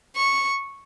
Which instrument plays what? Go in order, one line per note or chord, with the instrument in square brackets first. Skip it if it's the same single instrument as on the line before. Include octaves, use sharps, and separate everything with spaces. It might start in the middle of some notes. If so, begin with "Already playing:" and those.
[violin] C#6